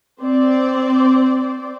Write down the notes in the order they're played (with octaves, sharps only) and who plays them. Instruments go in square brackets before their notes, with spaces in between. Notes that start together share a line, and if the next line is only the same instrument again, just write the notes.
[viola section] C4 C5 D5